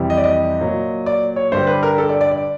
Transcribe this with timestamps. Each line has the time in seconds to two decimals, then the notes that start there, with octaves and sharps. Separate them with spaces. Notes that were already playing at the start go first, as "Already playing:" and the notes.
Already playing: F2 C3 E3 G3
0.10 D#5
0.17 D5
0.24 D#5
0.61 A#2 F#3
1.06 D5
1.36 C#5
1.52 G2 D3 G3 C5
1.67 B4
1.83 A#4
1.98 A4
2.09 D5
2.21 D5
2.31 D5